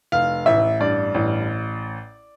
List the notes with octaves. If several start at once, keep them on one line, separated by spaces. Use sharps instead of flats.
F1 F5
A1 E5
G2 D5
A1